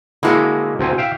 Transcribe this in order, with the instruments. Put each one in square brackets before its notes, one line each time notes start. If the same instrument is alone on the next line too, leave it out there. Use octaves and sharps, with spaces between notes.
[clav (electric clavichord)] D3 G#3 A#3 [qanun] E4 F#4 C6
[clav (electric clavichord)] D2 C4 G#5
E5 F5 G5